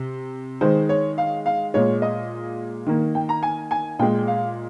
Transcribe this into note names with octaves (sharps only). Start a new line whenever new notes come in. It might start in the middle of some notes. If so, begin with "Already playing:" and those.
Already playing: C3
D#3 G#3 C5
C#5
F5
F5
A#2 G#3 C#5
D#5
D#3 A#3
G5
A#5
G#5
G#5
A#2 G#3 G5
F5